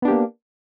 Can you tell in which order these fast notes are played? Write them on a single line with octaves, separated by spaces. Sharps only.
B3 D4 G4 A#3